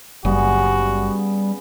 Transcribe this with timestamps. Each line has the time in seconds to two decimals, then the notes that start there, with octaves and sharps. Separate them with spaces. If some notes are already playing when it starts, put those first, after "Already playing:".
0.25 F#1 C#3 F#3 G3 B3 F#4 G#4